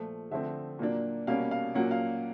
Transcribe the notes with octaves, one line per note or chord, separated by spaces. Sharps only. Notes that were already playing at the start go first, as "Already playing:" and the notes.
Already playing: A#2 F3 A3
D3 F3 A3 C4 E5
A#2 F#3 A#3 D4
B2 G3 A#3 C#4 F5
F5
A#2 F#3 A#3 C#4 F#5
F5